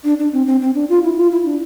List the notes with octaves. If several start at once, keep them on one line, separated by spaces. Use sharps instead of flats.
D4
D4
C4
C4
C4
D4
F4
E4
F4
E4
D4